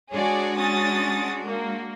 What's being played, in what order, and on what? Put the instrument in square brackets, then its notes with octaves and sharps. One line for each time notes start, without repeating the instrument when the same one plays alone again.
[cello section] G#3 D4 F#4 [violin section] G#4 C#5 D5
[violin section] C#4 D#6 A6
A#3